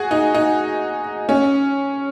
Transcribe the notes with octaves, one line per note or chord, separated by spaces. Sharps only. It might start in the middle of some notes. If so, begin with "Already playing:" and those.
Already playing: F#4 G#4
D#4
D#4
C#4